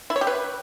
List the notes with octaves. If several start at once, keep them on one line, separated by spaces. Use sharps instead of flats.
E4
C#5
G4
B4